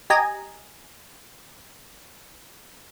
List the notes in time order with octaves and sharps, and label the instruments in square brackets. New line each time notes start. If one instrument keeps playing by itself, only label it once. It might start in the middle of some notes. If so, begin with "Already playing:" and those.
[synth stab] G4 D#5 G#5 A#5